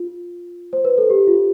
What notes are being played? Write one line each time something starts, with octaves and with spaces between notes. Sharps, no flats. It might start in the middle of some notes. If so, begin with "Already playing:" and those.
Already playing: F4
C5
B4
A4
G4
F4